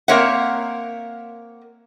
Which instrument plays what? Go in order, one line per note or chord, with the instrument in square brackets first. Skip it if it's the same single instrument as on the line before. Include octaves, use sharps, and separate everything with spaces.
[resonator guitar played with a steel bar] A#3 C4 A#4 C#5 E5 F#5